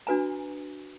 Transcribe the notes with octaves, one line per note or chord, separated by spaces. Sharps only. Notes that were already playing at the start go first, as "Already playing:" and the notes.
D4 F#4 B4 G#5 A#5